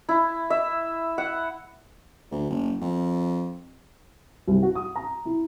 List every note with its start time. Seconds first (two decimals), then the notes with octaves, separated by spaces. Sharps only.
0.09 E4
0.50 E5
1.18 F#5
2.31 D2
2.50 F#1
2.82 F2
4.47 C2
4.63 F#4
4.75 D#6
4.96 A#5
5.25 E4